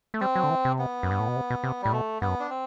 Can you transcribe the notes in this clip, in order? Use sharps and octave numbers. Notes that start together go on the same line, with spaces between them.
A3
G3 C4
F#3
D3
E3
C3
B3
F#2
G2
A2
B2
C3
B2
C3
A2 G3
B2 A3
G2 B3
F#2
D4
C4